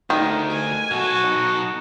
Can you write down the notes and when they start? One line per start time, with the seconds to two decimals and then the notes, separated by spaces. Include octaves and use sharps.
0.10 D2 D#3 D#4
0.51 G#5
0.91 B1 F#4 A4
1.27 D#4